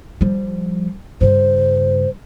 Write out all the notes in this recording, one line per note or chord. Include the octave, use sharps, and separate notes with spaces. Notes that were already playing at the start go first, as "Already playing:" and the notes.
F3 G3
G2 C#3 C5